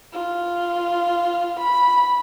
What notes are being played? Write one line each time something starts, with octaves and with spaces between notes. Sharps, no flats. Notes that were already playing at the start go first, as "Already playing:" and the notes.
F4
B5